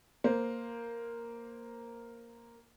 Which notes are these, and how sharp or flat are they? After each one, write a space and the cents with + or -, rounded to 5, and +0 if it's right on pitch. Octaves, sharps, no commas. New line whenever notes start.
A#3 +0 C5 +0